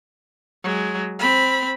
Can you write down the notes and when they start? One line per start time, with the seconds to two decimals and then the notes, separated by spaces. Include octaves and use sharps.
0.64 F#3 G#3
1.19 C4 B5